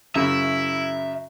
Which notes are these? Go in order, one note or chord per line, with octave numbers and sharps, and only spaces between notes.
F#2 C#3 E4 E5